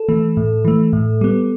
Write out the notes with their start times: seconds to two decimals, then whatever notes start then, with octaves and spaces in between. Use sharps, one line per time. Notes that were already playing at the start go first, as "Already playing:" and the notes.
Already playing: A4
0.09 E3 A3
0.37 A2
0.65 E3 A3
0.93 A2
1.21 G3 B3